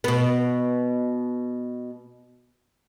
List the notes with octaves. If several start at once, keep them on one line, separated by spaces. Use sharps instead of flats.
B2 B3